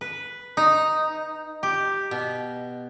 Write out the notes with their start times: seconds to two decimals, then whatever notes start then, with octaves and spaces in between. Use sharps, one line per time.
0.01 B4
0.57 D#4
1.63 G4
2.11 B2